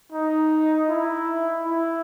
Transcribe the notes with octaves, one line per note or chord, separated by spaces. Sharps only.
D#4
E4
E4